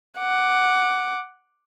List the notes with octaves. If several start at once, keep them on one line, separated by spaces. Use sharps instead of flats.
F#5 D6